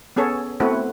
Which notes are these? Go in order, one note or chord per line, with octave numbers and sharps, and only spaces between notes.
B3 C#4 G#4 A4 C#5
A3 B3 C4 E4 F#4 B4